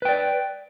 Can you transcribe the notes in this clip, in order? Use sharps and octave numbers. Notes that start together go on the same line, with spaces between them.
B4 D5 G5